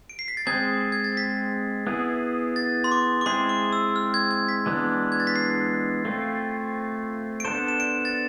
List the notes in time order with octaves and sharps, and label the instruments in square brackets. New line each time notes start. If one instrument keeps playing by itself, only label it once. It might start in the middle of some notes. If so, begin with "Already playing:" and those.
[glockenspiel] D7
C7
B6
A6
[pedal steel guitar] G#3 C4 G#4 [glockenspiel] G#6
[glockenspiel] G#6
A6
B6
[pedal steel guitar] B3 E4 G#4
[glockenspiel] A6
C6
D6
D6
[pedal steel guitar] G#3 C4 E4 G#4 [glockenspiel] C6
[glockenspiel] D6
E6
F6
G#6
G#6
B6
[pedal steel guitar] E3 G#3 B3 D4
[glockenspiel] G#6
A6
B6
C7
[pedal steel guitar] A3 C4 F4
[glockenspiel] D7
[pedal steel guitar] B3 D4 A4 C5 [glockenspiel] E7
[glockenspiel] E7
D7
A6